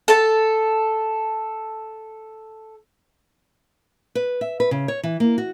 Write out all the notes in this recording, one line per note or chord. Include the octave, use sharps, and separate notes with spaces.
A4 A5
B4
E5
B4
C#3
C#5
E3
A#3
F#4